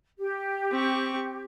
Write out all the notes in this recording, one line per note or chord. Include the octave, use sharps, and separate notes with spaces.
G4
C4 C#6